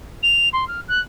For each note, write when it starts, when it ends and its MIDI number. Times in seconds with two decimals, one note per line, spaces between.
0.23 0.49 101
0.53 0.67 84
0.68 0.81 89
0.88 1.00 90